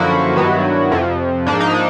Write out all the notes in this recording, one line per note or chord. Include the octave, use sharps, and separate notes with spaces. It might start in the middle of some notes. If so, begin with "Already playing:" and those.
Already playing: F#2 D3 F3 A#3 E4 F#4
G2 D#3 F#3 B3
F2 C3 F3
G#2 F3 A#3 D4
D#4
D4